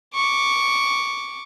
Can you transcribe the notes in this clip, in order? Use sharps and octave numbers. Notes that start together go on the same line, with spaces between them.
C#6 D6